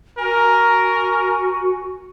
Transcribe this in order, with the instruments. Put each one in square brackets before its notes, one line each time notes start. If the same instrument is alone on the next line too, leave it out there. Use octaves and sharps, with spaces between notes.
[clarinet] F#4 [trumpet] A#4 [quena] G#5